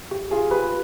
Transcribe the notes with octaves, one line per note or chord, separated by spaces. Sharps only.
G4
F4 G#4
G4 B4